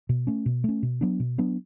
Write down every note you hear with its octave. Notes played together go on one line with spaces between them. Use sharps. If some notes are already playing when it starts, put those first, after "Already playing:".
B2
A3 C#4
B2
A3 C#4
B2
F#3 B3 D4
B2
F#3 B3 D4